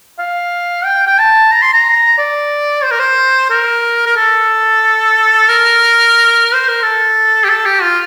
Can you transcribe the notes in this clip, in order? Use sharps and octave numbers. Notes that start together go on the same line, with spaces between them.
F5
G5
G5
A5
A#5
C6
A#5
D5
C5
A#4
C5
A#4
A#4
A4
A#4
C5
A#4
A4
G4
A4
G4
F4